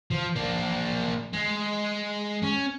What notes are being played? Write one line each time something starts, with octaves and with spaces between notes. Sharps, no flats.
F3
A#3 D4
G#3
C#4